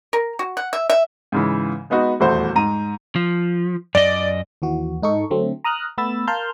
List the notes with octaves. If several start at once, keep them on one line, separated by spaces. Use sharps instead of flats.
A#4
F#4
F#5
E5
E5
G#2 C#3 E3
G#3 B3 D#4 F#4
D#1 E2 A3 E4 F#4 C5
G#2 A#5 D#7
F3
F#2 D5 D#5
D#2 E3 F#4
G#2 D#4 A4 C#6
D3 F#3 A3 C4
A#5 D#6 F6 F#6
A3 B3 B5 E6 A6
A#4 F5 A5 C6 F6 G6